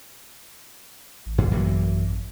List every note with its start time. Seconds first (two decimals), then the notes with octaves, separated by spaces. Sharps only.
1.26 A1
1.38 G2
1.51 F#2 E3 A#3